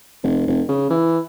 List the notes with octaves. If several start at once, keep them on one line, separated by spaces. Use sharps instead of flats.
F1
F1
C#3
E3